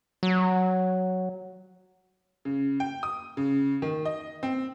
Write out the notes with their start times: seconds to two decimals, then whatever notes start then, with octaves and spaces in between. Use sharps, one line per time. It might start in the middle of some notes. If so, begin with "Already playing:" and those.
0.23 F#3
2.45 C#3
2.80 G5
3.03 D#6
3.37 C#3
3.82 D#3
4.05 D#5
4.43 C4